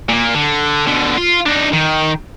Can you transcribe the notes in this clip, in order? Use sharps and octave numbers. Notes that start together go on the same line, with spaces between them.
A#2 A#3
D3
B2 D3
F4
D4 D#4
D#3